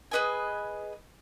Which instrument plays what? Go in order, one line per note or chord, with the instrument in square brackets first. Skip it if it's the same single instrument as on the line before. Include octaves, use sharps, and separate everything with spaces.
[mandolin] G#4 B4 D#5 G#5